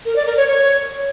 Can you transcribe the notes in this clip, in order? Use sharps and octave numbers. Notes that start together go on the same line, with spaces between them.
A#4
D5
A#4
C#5
C#5